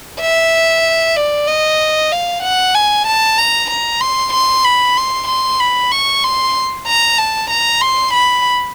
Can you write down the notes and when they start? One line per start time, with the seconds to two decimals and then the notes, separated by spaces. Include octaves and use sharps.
0.21 E5
1.16 D5
1.47 D#5
2.12 F5
2.43 F#5
2.75 G#5
3.07 A5
3.38 A#5
3.70 A#5
4.01 C6
4.33 C6
4.65 B5
4.97 C6
5.28 C6
5.60 B5
5.92 C#6
6.23 C6
6.87 A#5
7.18 A5
7.50 A#5
7.81 C6
8.13 B5